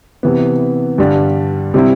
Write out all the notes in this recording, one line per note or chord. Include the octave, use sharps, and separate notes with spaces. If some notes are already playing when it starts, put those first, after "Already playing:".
C3 E3 B3
G2 D3 G3
C3 G3 C4 E4